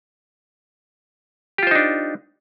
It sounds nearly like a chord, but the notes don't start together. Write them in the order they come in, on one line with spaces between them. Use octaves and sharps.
G4 F4 C5 D#4 D4